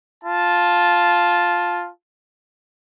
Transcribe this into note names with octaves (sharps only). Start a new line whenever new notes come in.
F4 A5